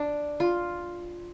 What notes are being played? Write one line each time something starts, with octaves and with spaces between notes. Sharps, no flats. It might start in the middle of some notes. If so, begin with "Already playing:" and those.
Already playing: D4
F4